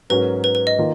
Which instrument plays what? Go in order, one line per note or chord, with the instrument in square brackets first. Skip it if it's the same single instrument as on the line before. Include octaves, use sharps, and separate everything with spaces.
[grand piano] G#2 F#3 C#4 F#4 A#4 [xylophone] B4
[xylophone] B4
B4
D#5
[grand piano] D#3 A#3 F4